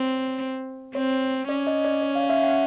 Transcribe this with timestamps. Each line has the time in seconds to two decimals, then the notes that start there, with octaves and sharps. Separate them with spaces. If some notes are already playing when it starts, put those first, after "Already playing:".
Already playing: C4 C#5
0.95 C4 C#5
1.49 C#4 D5
1.67 D#5
1.85 D5
2.02 C#5
2.15 F5
2.29 E5
2.43 F#5